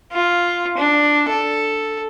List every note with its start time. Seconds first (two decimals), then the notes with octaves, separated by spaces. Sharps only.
0.12 F4
0.77 D4
1.29 A4